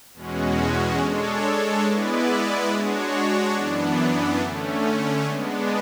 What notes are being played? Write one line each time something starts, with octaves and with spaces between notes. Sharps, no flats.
E2 B2 G#3 C#4 F#4
G#3 D4 A4 C#5
G#3 B3 E4 B4 D5
G#3 D4 F#4 C#5
F#2 E3 B3 D4
D3 A3 C#4
G#3 B3 D4